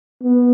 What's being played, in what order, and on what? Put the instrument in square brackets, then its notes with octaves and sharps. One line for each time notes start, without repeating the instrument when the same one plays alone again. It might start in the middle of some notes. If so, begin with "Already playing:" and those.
[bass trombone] B3